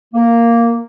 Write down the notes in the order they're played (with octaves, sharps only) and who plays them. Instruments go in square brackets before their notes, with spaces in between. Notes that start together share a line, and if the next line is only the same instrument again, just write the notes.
[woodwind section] A#3